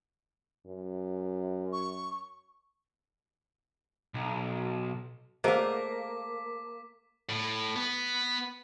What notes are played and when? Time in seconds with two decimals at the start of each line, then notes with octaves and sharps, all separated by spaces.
0.67 F#2
1.73 C#6
4.14 B1
5.44 A3 A#3 G#4 C5 D#5 F5 D6 B6
7.29 A2
7.76 B3